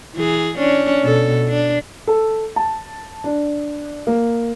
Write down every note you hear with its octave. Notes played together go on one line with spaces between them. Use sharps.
E3 G#4
C#4 D4
B2 A4
D4
A4
A5
D4
A#3